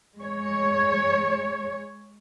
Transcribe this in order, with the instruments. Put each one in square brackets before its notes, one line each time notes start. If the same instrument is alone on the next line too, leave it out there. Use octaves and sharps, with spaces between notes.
[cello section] G#3 C#5